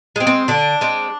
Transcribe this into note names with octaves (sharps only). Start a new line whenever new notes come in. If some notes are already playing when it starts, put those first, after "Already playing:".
G#3 C4
C4
D3 D4
G#3 C4